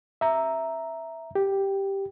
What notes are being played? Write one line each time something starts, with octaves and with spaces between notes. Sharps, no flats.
E5 A#5
G4